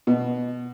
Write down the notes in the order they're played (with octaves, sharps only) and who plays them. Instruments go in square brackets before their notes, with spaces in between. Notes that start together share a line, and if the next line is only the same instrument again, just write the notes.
[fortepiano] B2